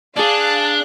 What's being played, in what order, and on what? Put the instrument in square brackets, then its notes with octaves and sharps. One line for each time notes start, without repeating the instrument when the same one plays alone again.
[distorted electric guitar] D4 [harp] G#4 D5 [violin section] F5 F#6 [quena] A5